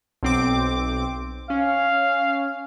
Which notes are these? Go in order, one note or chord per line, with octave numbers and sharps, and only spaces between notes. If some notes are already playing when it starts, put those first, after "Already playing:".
B1 C4 D6
C#4 F5